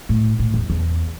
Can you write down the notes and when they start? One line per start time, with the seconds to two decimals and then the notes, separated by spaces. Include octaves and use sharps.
0.09 A2
0.39 A2
0.54 E2
0.70 E2